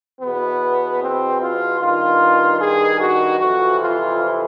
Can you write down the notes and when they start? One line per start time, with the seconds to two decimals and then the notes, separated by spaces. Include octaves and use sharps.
0.21 E2 B2 B3
1.02 C4
1.41 F4
1.80 G2 D#3 F4
2.61 G#4
3.00 F#4
3.39 F2 C3 E3 F#4
3.80 F4